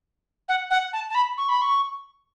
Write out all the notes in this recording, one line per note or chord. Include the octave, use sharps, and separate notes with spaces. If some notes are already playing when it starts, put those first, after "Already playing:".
F#5
F#5
A5
A5
B5
C#6
B5
C#6